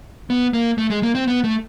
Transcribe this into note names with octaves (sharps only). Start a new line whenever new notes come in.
B3
A#3
A3
G#3
A#3
C4
B3
A3